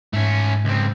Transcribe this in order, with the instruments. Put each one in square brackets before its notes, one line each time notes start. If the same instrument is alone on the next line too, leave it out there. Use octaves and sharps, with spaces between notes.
[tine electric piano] G#2 [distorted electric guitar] A3 C#4
[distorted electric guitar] C#2 C4